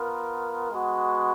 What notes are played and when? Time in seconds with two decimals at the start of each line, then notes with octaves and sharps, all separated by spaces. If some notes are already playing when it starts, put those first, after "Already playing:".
Already playing: B3 F4 A#4
0.70 G#3 B3 F#4